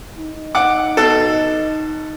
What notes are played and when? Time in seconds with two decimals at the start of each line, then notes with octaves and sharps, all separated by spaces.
0.18 D#4
0.55 F#5 D6
0.97 B2 A4